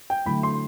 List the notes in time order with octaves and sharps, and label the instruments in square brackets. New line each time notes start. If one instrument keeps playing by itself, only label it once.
[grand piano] G5
[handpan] D3 F#3 A3 E4 [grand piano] B5
[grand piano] C6